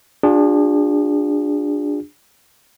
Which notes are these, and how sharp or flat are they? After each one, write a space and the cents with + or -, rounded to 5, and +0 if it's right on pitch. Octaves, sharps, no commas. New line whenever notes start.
D4 +0 F4 +35 G#4 -35